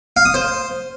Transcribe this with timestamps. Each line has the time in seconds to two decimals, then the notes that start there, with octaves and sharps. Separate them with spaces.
0.17 F5
0.25 D#6
0.34 C5